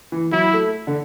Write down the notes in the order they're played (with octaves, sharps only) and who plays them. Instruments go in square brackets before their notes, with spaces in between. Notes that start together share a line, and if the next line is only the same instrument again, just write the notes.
[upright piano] E3
[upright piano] F#3 [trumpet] E4
[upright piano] A3
D3